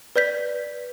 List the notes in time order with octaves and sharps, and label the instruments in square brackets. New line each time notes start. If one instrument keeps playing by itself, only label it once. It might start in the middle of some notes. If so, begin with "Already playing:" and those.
[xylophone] B4 D5 G6 B6